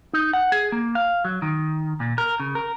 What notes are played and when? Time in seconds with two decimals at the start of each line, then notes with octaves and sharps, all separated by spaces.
0.13 D#4
0.33 F#5
0.52 G#4
0.72 A#3
0.95 F5
1.25 F#3
1.42 D#3
2.00 A#2
2.18 A#4
2.40 C#3
2.55 A#4